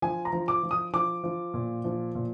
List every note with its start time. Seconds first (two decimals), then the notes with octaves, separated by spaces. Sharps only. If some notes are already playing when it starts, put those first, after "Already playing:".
0.02 F3 G#5
0.25 A#5
0.32 F3
0.48 D6
0.63 F3
0.71 D#6
0.93 F3 D6
1.23 F3
1.54 A#2
1.84 F3
2.15 A#2